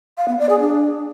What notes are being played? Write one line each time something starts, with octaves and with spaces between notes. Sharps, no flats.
F5
B3
D5
G#4
D4